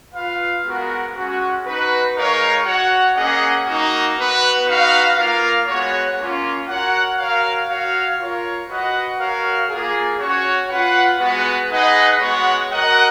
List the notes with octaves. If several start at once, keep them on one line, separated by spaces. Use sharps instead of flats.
F4 B4 F5
G#3 B3 F#4 A#4
G#3 C#4 F#4
D#4 F#4 B4
G#3 D#4 A#4 C#5 F5
F#4 C#5 F#5
A#3 C#4 G#4 D#5 F#5
A#3 D#4 F#4
B3 F#4 B4
D#4 F#4 B4 F5
A#3 F4 A#4 F5
G#3 B3 F#4 C#5
A#3 C#4 F4
F#4 A#4 C#5 F#5
F#4 A#4 C#5 F5
F#4 C#5 F5
F4 A#4 C#5
F#4 B4 D#5 F#5
F#4 A#4 C#5 F5
A#3 F4 G#4
C#4 F#4 C#5
F4 B4 F#5
G#3 B3 F#4 B4
D#4 G#4 B4 D#5 F#5
G#3 B3 F#4 C#5 F#5
F#4 A#4 D#5 F#5